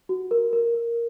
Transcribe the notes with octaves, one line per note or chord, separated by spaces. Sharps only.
F#4
A#4
A#4
A#4